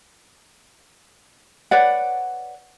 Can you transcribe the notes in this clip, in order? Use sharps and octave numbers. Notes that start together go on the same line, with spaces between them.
B4 C#5 D5 F#5